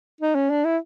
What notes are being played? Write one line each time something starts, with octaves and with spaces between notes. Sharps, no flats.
D#4
C#4
D4
E4